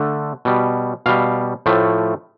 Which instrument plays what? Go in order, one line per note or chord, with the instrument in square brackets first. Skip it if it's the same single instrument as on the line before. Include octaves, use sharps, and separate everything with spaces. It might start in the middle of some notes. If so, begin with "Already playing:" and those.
Already playing: [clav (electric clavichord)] D3 A3
B2 G3
B2 G3 F5
A2 F3 A3